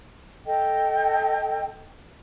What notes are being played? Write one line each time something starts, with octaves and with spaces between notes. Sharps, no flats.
A4 D#5 G5